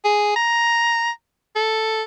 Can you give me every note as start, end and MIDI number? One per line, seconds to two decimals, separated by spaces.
0.04 0.33 68
0.36 1.10 82
1.56 2.03 69